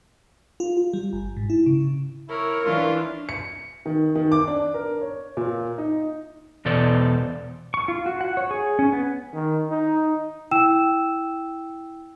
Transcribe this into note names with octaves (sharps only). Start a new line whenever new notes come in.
F4
F4
G3
G1
G#2
E4
C#3
E4 A#4 C#5
E3 D4 F4
C#7
D#3
D#3
D6
D4
A#4
C#5
A#2
D#4
E2 B2 A4 C5 D5
C#6
F4
F#4
F#5
C#5
G#4
C#4
B3
D#3
D#4
E4 G5 E6 E7